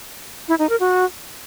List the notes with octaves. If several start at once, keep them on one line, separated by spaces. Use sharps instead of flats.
E4
D#4
A#4
F#4